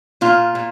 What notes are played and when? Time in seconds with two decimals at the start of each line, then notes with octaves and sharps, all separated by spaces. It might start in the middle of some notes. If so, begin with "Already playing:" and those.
0.21 A#2 F4
0.55 A#2